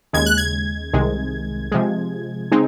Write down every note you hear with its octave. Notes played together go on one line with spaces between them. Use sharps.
D#2 C#3 G#3 G#6
F#6
G#6
C2 C3 D#3 G#3
C3 F3 G#3
C#3 G#3 C4 D#4